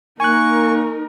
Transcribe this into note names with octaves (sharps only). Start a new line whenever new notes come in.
A#3 D#4 A#4 G#5 C#6 F#6